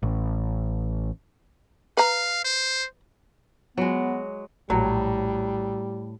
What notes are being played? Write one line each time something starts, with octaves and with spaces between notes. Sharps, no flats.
A1
B4 F5 A#5
C5
F#3 G#3 B3
A#1 A2 F#3 G3